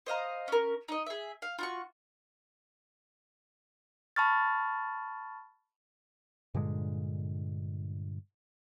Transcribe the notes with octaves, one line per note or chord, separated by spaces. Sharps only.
C5 D#5 F5 A#5
C#4 A#4
D#4 D#5
G#4 E5
F5
F4 F#4 C#6
A5 B5 C#6 F6 A6
G2 A#2 D3 G#3